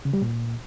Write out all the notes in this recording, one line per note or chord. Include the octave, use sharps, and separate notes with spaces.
C#3
G3
A#2